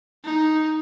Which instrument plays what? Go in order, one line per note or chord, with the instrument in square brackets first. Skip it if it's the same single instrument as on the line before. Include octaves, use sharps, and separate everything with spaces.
[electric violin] D#4